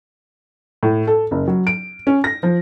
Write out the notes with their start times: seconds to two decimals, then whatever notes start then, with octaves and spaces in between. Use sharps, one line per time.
0.83 A2
1.07 A4
1.31 F#1
1.48 F#3
1.67 D7
2.07 C#4
2.24 A#6
2.43 F3